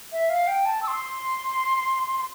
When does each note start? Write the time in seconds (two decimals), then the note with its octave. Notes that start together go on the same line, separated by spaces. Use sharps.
0.12 E5
0.30 F5
0.47 G5
0.65 A5
0.83 E6
0.87 C6